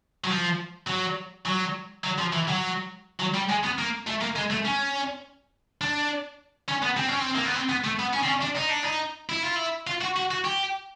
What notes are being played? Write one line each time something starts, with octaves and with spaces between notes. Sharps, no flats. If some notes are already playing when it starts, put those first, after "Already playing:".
F#3
F3
F#3
F#3
F#3
F3
E3
F#3
F#3
G3
G#3
B3
A#3
A3
A#3
G#3
A3
C#4
D4
C#4
B3
C4
C#4
C4
A#3
B3
C4
B3
A3
B3
C#4
C4
C#4
D4
D#4
D4
D#4
E4
F4
E4
F4
F#4
F#4
F#4
G4